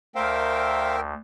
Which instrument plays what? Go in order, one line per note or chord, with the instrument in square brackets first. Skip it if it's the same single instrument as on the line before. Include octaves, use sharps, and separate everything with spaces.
[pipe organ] D2 [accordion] A#4 E5 G5 [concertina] C5 F5